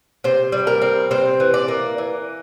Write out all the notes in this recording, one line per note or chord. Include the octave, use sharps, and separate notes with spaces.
C3 C5
G3
A#4
C4
C3 C5
E3
D5
A#3
E3